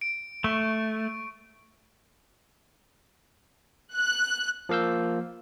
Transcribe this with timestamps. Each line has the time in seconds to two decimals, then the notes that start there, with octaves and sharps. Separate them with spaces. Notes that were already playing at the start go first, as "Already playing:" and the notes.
0.01 D7
0.44 A3 C#6
3.94 F#6
4.69 F3 A#3 F5 E6 G6